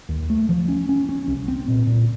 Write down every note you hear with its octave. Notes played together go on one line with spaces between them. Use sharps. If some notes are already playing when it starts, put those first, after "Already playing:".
D#2
A3
F3
C#4
C#4
C#4
C2
C4
A#2
A#2